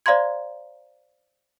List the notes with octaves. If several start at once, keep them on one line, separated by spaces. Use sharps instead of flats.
C5 D5 F5 A#5 C6 G#6